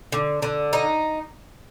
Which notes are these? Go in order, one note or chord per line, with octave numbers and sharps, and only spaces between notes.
D3
D3
D#4